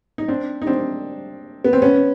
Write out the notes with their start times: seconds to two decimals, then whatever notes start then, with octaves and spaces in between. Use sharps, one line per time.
0.18 D#4
0.28 C4 D4
0.62 D#4
0.67 C4 D4
1.64 B3
1.73 C4
1.82 B3 C#4